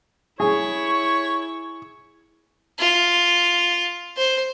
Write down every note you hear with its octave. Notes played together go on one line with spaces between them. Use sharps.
E4 G#4 C#5 C#6
F4
C5